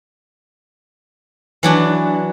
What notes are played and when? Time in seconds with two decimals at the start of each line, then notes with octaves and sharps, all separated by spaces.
1.63 E3 F#3 D4